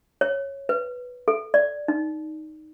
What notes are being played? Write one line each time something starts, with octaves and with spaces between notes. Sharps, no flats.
C#5
B4
A4
D5
D#4